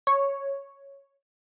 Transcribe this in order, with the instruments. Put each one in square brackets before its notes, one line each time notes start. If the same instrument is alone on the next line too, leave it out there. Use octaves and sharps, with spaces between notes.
[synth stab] C#5